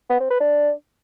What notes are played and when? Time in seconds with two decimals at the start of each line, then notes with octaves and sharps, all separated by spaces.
0.10 B3
0.20 C4
0.30 B4
0.40 D4